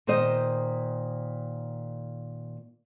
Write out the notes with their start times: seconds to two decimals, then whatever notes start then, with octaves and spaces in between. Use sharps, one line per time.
0.07 A#2 D#3 A#3 C5 D#5